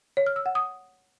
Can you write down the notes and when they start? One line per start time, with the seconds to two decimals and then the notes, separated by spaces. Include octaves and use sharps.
0.17 C#5
0.26 F6
0.36 E6
0.46 F#5
0.55 D#6